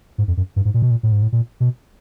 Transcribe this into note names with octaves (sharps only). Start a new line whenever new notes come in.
G#2
F2
F#2
G2
G#2
A#2
B2
A#2
A2
G#2
A2
A#2
B2